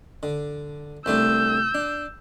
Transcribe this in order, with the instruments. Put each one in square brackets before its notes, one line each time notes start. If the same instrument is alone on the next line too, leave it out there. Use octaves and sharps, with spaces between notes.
[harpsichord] D3
[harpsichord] C2 A3 D4 [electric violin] E6 G6
[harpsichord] D4